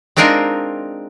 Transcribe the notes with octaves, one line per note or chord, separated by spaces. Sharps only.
G#3 C4 D4 D#4 F4 A#4